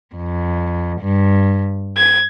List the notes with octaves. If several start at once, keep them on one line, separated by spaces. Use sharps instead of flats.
F2
G2
G#6